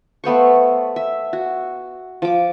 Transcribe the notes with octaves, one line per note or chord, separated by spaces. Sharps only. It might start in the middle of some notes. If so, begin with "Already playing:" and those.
A3 B3 C5 C#6
E5
F#4
F3 D6